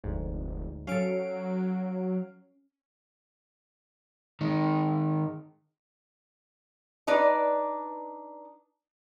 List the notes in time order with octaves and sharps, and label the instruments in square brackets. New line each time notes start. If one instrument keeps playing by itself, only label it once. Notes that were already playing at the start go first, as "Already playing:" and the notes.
[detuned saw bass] F1 [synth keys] D2 G#2
[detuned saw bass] F#3 [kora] C#4 A4 [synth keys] F5 D7
[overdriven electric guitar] D#3 G#3
[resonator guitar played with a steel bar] D4 D#4 B4 D5